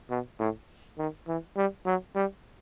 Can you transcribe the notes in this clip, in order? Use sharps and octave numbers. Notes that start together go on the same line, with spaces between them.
B2
A2
D#3
E3
G3
F#3
G3